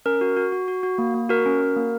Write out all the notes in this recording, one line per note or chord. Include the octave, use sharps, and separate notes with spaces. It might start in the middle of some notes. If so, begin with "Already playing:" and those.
C#4 A#4
F#4
F#4
F#4
F#4
F#4
A#3
A#3
F#4 A#4
C#4
F#4
A#3